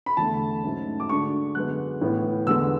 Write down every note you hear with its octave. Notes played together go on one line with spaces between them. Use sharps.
B5
E2 D3 A3 A5
G#2 F#3 A3 C#4
D6
D2 D3 G#3 D4 C#6
F#2 D3 G#3 B3 F#6
A2 E3 B3
E2 D3 G#3 B3 E6